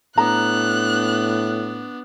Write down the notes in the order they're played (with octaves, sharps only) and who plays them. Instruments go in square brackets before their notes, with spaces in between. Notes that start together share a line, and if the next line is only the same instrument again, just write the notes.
[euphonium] A2 [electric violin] B3 D4 [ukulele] A#5 [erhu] F#6